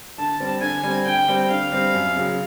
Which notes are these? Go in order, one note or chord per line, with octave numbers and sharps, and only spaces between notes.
D3 A5
G3 C4
D3 G#5
G3 C4
D3 G5
G3 C4
D3 F5
G3 C4
F#2
C#3 F#3